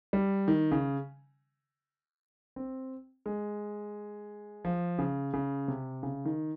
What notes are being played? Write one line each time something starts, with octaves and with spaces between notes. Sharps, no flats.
G3
D#3
C#3
C4
G#3
F3
C#3
C#3
C3
C#3
D#3